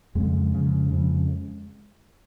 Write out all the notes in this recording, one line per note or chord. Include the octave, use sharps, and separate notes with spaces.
F2 C#3 G#3
F2 C#3
F2 C#3